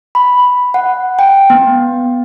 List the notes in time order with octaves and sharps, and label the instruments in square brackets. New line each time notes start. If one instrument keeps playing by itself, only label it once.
[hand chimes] B5
F#5
G5
B3